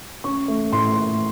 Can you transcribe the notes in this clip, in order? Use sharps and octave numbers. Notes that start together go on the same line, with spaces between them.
C#4 C#6
A3
A2 C6
A3